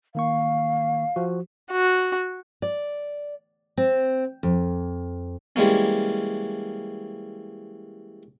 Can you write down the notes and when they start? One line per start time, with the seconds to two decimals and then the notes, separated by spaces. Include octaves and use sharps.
0.15 D#3 A#3 F5 C#6
1.16 F3 F#4
1.72 F#4
2.62 D5
3.77 C4
4.43 F2
5.56 E3 G3 G#3 A#3 C#4